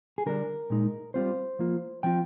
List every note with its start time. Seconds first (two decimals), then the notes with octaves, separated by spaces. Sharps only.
0.18 G#4
0.26 D3 G3 D4 A#4
0.70 A#2 G#3 D#4
1.14 G3 C4 F4 C5
1.59 F3 A#3 F4
2.03 F3 C4 F4 G5